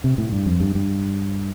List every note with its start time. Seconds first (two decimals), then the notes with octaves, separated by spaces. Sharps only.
0.04 C3
0.18 A2
0.32 G2
0.46 F2
0.60 G2
0.75 G2